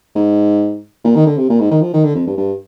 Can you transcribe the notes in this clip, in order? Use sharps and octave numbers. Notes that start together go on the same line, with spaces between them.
G#2
A#2
D#3
D3
C3
A#2
G#2
D#3
F3
D#3
D3
F2
G2
G2